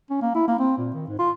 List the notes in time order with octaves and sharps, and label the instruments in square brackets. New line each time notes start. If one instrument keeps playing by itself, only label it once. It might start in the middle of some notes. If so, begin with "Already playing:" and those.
[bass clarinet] C#4
A#3
E4
A#3
C4
A#2
D#3
G#2
F4